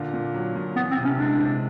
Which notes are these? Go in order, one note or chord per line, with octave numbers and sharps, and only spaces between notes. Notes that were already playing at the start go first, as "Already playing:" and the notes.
Already playing: A#2 D3
A#2
F#3
A#2
E3 B3
C4
C3
C#4
G#3 D4
C3